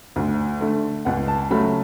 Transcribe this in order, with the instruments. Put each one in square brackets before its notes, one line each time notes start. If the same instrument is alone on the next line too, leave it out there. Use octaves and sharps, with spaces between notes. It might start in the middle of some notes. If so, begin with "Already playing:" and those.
[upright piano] D2
D3 A3
C#2 F#5
A5
C#3 F#3 A3 B5